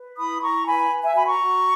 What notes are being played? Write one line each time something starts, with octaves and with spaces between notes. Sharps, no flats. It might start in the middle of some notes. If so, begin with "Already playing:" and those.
Already playing: B4
E4 B5 D#6
E4 A#5 C#6
B4 G#5 B5
B4
E5 G#5
F#4 G#5 B5
A#5 C#6
F#4